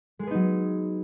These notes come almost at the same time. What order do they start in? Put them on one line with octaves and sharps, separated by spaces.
G#3 G#4 B3 D#4 F#3